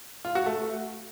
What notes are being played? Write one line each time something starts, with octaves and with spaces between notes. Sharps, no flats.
F4
F#4
A3